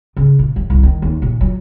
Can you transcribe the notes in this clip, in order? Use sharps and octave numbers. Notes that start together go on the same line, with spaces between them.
C#3
A#2
F#3
C2
D#3
D#2
A#2
F#3